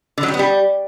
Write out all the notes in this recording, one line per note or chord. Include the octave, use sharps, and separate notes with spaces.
D3
F#3
G3
B3
G3